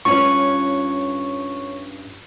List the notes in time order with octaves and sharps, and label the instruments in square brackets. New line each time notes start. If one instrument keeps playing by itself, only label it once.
[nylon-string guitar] G2 C#4 F4 [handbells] C#5 C#6